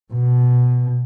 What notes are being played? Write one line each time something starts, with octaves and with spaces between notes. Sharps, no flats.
B2